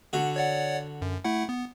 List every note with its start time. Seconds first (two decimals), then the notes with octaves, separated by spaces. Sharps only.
0.13 D3 F#4
0.36 C#5 D5 F#5
1.02 F#2
1.25 A3 E4 F#5
1.49 B3